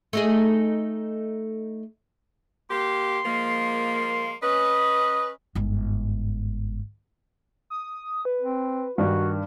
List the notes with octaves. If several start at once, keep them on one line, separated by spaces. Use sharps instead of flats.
A3 D#4 G#4
A#3 G4 C6
F3 G#3 A#3
C#4 B4 D#5
G1 G#2
D#6
B4
C4
G2 D#3 F#4